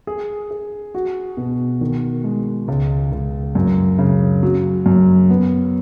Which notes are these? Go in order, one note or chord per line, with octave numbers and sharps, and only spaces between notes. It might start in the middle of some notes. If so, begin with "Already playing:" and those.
G#4
G#4
F#4
B2
D#3
G#3
C#2
C#2
F#2
C#3
F#3
F#2
B3